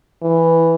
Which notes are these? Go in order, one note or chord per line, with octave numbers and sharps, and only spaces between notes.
E3